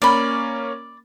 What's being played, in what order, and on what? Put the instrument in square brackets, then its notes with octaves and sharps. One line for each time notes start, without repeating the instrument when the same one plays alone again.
[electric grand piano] A#3 C#4 [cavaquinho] D5 B5